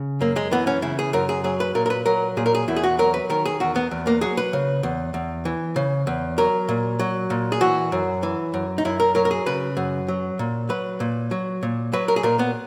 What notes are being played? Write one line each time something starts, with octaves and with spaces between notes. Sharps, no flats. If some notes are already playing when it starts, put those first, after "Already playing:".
Already playing: C#3
F#2 A#3
G#3
E3 B3
C#4
C#3 E4
G#4
F#2 A#4
G#4
F#3 G#4
B4
A#2 A#4
A#4
B4
F#3 A#4
A#2 G#4
A#4
G#4
E2 E4
G#4
F#4
F#3 A#4
B4
D#3 A#4
G#4
E2 F#4
B3
E2
A#3
F#3 G#4
B4
C#3
E2
E2
E3
C#3
E2
F#3 A#4
A#2
F#3
A#2
G#4
E3 F#4
F#2
E3
F#2
D#4
F#2 E4
A#4
F#3 A#4
A#4
G#4
C#3 B4
F#2
F#3
A#2
F#3 B4
A#2
F#3
A#2
F#3 B4
A#4
G#4
A#2 A#4
B3